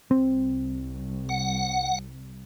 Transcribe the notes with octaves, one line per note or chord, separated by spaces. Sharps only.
C2 C4
F#5